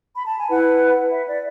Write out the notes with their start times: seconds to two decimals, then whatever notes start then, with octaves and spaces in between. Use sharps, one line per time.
0.15 B5
0.27 A5
0.38 G#5
0.49 E4 B4 F#5
1.12 E5
1.27 D5